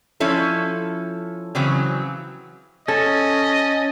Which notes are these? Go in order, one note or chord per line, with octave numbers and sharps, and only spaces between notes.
F3 C#4 E4 A4
C#3 E3 F#3 C4
C#4 A4 D#5 A6